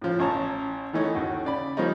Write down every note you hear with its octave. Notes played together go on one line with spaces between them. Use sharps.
A2 C#3 F3
A1 C#4 A5 A#5
D#3 E3 A3 C#4 D#4
D#2 F#4
C#3 D5 B5
F3 G3 A#3 C4 C#4 D#4